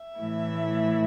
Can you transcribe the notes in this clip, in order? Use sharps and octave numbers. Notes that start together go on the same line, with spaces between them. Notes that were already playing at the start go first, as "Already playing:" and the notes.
Already playing: E5
A2 E3 A3 E4